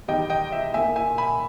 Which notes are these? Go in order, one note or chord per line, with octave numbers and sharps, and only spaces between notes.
E2 D#3 G3 D#5 G5
D#5 G5
E5
A#2 A#3 E5 G#5
E5 G#5
G#5 B5